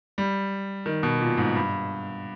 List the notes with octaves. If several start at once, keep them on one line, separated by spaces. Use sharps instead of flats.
G3
D#3
B2
A#2
G#2
G2